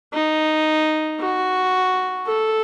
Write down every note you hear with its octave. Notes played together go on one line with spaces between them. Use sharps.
D#4
F#4
A4